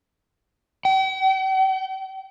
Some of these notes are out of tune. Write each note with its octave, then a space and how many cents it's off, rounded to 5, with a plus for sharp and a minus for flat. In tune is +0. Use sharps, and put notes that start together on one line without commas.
G5 -45